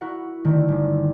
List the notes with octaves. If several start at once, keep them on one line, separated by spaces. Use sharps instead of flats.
E4 F#4 A#4 F#5
D3 D#3 A3 C4 E4
G1